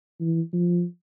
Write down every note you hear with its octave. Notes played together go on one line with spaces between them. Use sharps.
E3
F3